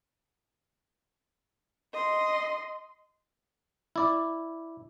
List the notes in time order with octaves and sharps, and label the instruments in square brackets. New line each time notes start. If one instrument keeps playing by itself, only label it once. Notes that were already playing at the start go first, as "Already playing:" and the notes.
[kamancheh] D#5 C6
[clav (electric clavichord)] E4 D5